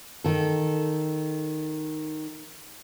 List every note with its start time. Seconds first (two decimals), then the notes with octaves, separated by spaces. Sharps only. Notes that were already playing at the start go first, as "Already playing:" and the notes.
0.24 D#3 A4